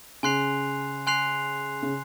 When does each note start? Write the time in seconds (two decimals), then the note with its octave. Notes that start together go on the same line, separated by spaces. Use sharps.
0.23 C#3 G#5 C6 F#6 C7 F7
1.07 G#5 C6 F#6 C7 F7
1.82 C#3